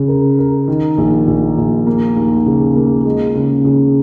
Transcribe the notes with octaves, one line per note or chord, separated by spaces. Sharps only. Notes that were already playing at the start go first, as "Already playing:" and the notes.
Already playing: C#3
A#4
A#4
D#3
A#1
A#1
A#1
A#3
D#2
C#3
A#3
G#3
C#3
C#3